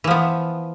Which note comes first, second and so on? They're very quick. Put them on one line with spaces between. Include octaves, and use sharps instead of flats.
E3 F3 B3